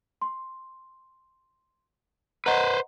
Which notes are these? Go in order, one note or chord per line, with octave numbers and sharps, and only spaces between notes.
C6
B4 C5 D#5 F#5 A#5